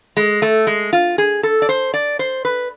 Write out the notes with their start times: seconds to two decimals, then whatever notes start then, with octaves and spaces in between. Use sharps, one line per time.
0.17 G#3
0.42 A3
0.67 G#3
0.93 F4
1.18 G#4
1.43 A4
1.62 D5
1.69 C5
1.94 D5
2.19 C5
2.45 B4